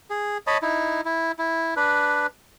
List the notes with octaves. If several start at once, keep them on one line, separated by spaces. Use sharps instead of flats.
G#4
C#5 D#5 A5 B5
D#4 E4
E4
E4
D4 B4